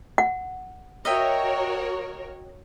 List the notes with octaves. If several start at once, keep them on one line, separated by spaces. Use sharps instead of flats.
F#5
F#4 A#4 C#5 D#5 E5 G5